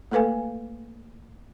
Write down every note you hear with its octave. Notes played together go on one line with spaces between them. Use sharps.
A3 A#3 A4 B4 F5 G#5